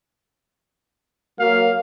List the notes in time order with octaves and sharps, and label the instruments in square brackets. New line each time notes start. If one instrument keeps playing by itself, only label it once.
[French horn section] F#3 A#3 [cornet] F5